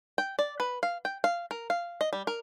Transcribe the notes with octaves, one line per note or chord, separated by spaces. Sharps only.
G5
D5
B4
F5
G5
F5
A#4
F5
D#5
G3
A#4